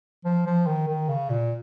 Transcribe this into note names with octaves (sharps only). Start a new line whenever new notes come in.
F3
F3
D#3
D#3
C#3
A#2